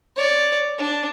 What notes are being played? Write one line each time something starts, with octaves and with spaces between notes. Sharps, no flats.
C#5 D5
D4